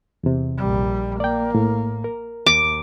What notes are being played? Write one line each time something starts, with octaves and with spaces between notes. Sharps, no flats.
E2 C3
A#1 G3
A#3 D5 G5
A2
A#4
D#2 D6